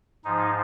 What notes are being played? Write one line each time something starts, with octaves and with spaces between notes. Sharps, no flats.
G#2 F3 D#4